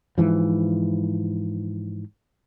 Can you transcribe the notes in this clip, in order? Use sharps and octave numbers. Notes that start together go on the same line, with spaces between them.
G#2 E3 F3